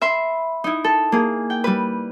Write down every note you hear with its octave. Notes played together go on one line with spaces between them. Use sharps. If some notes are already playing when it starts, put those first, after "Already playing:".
E5 B5 C6
D#4 E4
A4
A#3 G#4
G5
G3 B4